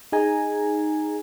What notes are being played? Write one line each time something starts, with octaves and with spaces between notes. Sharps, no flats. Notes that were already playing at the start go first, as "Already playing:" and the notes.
D#4 G#4 G#5 A#5